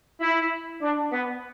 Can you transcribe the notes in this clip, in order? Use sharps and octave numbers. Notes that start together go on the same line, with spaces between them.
E4
D4
B3